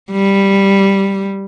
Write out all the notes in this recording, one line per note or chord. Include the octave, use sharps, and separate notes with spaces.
G3